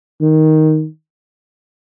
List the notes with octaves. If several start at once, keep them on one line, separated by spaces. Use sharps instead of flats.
D#3